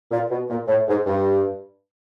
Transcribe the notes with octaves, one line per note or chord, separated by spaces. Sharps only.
A#2
B2
A#2
A2
G#2
G2